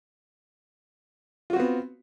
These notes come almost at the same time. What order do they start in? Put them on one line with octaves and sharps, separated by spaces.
F4 F#4 C4 B3